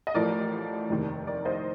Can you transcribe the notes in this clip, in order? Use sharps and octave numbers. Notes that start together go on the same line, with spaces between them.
D#5
A1 A2 F3 A#4 D5
F1 D#2 D#3
A#4 D5
C5 D#5